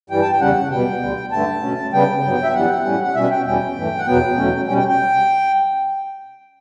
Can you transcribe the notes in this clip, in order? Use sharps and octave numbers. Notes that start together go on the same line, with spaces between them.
G2 E3 G3 G5
A5
G5
E2 C#3 G3 C#4 F#5
B2 G3 B3 G5
D2 D3 G3
G2 D3 A3 A5
B2 A3 C#4
C#3 G3 B3 G5
G2 F#3 B3
E5
F#2 E3 G3 B3 F#5
A2 G3 C#4
F#5
B2 G3 C#4 E5
G5
E2 B2 G3 C#4 G5
G2 E3 A3
F#5
E2 B2 F#3 B3 G5
E2 B2 F#3 A3 C#4
B2 G3 C#4 G5
G5
G5